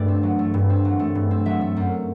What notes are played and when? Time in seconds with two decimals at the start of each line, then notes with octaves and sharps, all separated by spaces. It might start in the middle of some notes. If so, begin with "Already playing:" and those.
Already playing: G2 A3 D5
0.08 C4
0.23 F#3
0.39 A3
0.54 G2
0.70 C4
0.85 F#3
0.99 A3
1.15 G2
1.31 C4
1.46 F#3 E5
1.61 A3
1.77 F#2